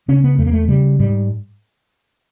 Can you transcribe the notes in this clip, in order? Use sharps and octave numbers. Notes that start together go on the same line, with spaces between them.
C#3 C#4
B3
E2 A3
A#3
A3
C#3 G3
G#2 G3